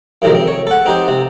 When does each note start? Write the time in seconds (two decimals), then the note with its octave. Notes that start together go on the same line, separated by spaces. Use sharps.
0.22 F#2 A2 C3 D#3 G#3
0.35 C4
0.47 C#5
0.67 A4 F#5
0.86 C4 D#4 G4 C5
1.08 C3